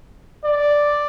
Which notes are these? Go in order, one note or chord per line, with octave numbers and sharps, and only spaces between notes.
D5